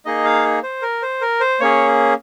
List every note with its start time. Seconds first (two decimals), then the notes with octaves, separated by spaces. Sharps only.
0.05 A#3 D#4 G#4 D#5
0.25 F5
0.63 C5
0.82 A#4
1.02 C5
1.21 A#4
1.40 C5
1.60 A#3 C#4 G#4 C#5